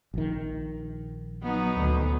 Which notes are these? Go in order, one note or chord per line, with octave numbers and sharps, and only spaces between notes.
A#1 D#3
F#3 B3 D#4
D2